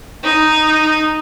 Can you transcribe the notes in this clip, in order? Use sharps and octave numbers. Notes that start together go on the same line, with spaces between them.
D#4